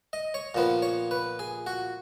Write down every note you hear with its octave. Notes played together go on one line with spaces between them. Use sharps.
D#5
C#5
A#2 F3 B3
C#5
B4
G#4
F#4